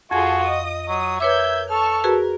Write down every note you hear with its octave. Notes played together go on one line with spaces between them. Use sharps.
F2 F4 F#4 G#4 A4 G#6
D#5 D#6
F#3 D#6
A#4 B4 C#5 E5 D6 G6 G#6
A4 A5 C#6 F6
F#4 G#4 A#4 B4